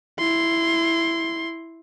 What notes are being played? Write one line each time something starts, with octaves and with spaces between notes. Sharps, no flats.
E4 C6